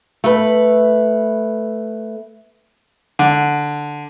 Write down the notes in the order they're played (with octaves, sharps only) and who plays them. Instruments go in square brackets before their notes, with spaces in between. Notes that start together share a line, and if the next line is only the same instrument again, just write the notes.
[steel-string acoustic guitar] A3 B4
[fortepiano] D3